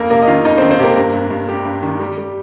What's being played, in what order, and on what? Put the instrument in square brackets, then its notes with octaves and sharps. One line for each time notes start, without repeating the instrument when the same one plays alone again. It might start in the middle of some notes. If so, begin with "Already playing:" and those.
Already playing: [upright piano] F2 A#3 A#4
C3 A#3 A#4
D#5
D#3 F4 F5
F2 D#4 D#5
C4 C5
D#3
C4 C5
C3 A#3 G4 A#4
G2
G2
G2
G3 G4
G2
D#3
G3
G3